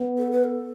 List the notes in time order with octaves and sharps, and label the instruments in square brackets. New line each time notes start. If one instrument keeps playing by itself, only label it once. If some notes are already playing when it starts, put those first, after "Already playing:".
Already playing: [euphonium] B3
[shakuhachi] A4
B4
A4